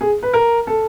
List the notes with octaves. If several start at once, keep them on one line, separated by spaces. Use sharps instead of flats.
G#4
B4
A#4
A4